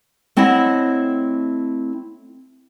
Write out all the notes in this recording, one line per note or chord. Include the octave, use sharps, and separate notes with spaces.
A3 C4 E4 C#5 D#5 F#5